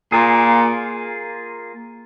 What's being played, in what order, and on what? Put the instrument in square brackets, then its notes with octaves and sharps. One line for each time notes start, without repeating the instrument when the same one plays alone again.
[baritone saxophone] A#2 [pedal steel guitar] A#3 F4 G#4